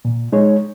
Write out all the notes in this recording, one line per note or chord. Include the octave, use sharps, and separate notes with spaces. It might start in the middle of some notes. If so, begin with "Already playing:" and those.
A#2
G#3 D#4 G#4 C#5